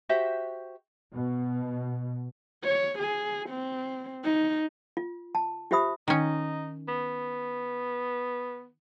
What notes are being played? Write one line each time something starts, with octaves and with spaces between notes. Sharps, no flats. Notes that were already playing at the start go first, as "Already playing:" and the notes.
F#4 G4 C5 E5
B2
C#5
G#4
C4
D#4
F4
A5
F4 G4 C5 E5 B5 D#6
D#3 C#4 D#4
B3